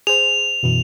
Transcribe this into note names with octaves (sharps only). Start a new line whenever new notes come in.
G#4 C5 F7
F#2 B2 E3